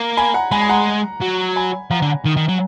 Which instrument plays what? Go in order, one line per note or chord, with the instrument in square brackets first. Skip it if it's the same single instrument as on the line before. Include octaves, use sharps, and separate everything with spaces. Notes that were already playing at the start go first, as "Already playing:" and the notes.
Already playing: [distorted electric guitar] A#3
[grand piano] G#5 B5
F#5 A#5
[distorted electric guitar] G#3 [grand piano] G#5 B5
[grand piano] G#5
F#5 A#5
[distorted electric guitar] F#3
[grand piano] G#5 B5
[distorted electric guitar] F3 [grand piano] F#5 A#5
[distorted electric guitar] D3
D#3
D#3
F#3